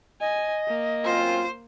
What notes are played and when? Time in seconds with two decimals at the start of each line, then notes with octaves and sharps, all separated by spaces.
0.21 D#5 G#5
0.68 A#3
1.05 F#2 C4 F4 C5